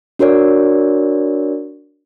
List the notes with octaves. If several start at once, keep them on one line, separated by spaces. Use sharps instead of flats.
D4 F#4 A#4 C#5 D5